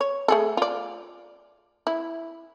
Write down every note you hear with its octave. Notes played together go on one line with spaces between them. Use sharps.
C#5
A3 G#4 A4
F4 D5
E4